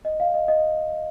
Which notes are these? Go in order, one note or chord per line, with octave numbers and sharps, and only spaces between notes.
D#5
F5
D#5
D#5